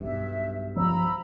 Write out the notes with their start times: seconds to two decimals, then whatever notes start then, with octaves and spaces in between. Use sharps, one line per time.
0.01 B1 G2 E5
0.76 F3 A#5 B5 E6